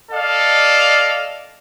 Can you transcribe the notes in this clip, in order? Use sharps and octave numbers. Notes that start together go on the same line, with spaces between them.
A4 D5 D#5 F5